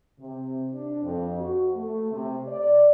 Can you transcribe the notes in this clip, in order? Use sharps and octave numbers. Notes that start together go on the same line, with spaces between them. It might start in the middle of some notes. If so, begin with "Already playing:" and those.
C3
D4
F2
F#4
A3
C3
D5